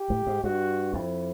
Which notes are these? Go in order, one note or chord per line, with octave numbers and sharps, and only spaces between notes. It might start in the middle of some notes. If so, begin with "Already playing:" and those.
Already playing: G4
A2
G#2
G2 F#4
F2 E4